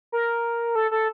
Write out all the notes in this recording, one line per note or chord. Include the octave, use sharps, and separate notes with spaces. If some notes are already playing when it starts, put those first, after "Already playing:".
A#4
A4
A4